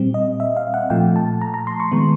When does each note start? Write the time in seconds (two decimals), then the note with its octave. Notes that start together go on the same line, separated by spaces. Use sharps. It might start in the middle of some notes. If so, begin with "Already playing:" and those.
Already playing: A#2 G3 C4
0.14 D#5
0.40 E5
0.57 F5
0.74 F#5
0.90 A#2 F3 A3 G5
1.16 A5
1.42 A#5
1.54 A#5
1.67 C6
1.80 C#6
1.92 D#3 G#3 B3